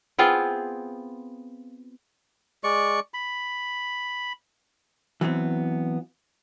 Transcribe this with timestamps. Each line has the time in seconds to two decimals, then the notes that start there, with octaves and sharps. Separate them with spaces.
0.18 B3 C4 F4 G#4
2.64 G#3 D5 C#6
3.14 B5
5.21 E3 F#3 B3 C4